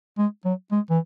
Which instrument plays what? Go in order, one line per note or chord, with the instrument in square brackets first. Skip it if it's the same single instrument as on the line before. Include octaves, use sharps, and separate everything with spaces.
[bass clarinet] G#3
F#3
G#3
E3